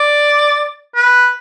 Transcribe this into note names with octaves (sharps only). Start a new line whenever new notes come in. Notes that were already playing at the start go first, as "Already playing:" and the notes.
Already playing: D5
B4